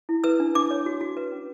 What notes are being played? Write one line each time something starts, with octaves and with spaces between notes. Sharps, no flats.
E4
B4 E6
D4
D4 D6
C#5
F#4
F#4
B4
C#4